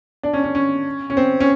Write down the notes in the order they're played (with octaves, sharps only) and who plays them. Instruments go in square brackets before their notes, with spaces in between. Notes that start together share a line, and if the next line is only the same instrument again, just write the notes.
[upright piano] D4
C#4
C#4
C#4
C#4
C4
C#4